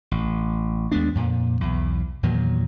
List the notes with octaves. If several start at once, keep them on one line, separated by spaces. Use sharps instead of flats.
A1
D#2 G#3 B3 D4
F2 A#2
B1 E2
E2 A#2 D#3 F#3